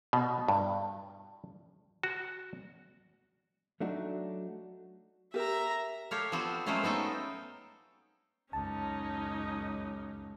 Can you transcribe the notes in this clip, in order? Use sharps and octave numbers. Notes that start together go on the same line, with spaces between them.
B2
G2
F#4
F#3 A3 D4 D#4 F#4
G4 A#4 E5 A#5
G4 A4 C#5 F5
F3 B3 C4 F4 F#4
F#3 G#3 A3 C#4 C5 F5
B3 D#4 A4 G5
C#2 F#2 C#4 D#4 A5